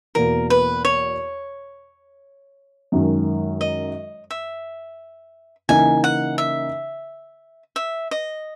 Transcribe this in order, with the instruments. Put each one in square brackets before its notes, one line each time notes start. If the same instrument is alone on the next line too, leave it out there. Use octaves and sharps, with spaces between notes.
[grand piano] E2 B2 A#3 [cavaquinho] A#4
[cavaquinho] B4
C#5
[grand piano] F#2 D#3 G#3
[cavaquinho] D#5
E5
[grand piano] C#3 E3 A#3 D#4 [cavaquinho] G#5
[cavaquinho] F#5
E5
E5
D#5